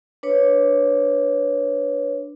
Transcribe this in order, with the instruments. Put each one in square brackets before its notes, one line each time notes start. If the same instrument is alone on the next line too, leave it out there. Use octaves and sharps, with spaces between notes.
[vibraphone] D4 B4 C#5